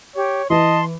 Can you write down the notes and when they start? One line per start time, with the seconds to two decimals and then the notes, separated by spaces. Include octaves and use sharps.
0.16 G4 C#5
0.50 E3 D#5 A5 C6